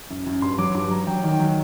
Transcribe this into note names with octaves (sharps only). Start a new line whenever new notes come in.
F#2
F#2
G2 C6
F#3 D6
G2 D6
F#3 A#5
F#3 G5
D#3 G5
F#3